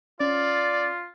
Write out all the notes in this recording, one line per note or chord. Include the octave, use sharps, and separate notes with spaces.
C#4 F4 D5